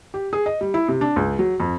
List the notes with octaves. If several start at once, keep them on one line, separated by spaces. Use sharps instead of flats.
G4
G#4
D#5
G3
E4
C3
D4
C#2
F#3
F2